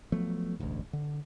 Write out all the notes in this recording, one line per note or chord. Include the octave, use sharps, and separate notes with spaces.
F3 F#3 A3 B3
E1 A1 D2 G#2
D3